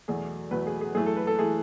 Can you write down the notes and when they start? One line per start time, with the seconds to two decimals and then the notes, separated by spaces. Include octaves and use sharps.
0.08 E2 B2 F#3 A3 G#4
0.51 E2 B2 F#3 A3 B4
0.67 G#4
0.81 G#4
0.95 F#2 E3 A3 G#4
1.06 A4
1.16 B4
1.27 A4
1.39 E3 A3 G#4